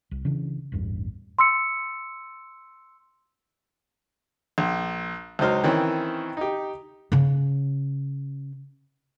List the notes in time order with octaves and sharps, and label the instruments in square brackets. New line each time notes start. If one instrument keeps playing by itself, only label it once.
[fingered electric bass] C2
C#3 E3 D4
A1 E2 G2
[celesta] C6 E6 C#7
[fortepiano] A#1
C#2 F#3 D#4 C5 F6
D#3 E3 C4 C#4
D#4 G4
[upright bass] C#3 C#4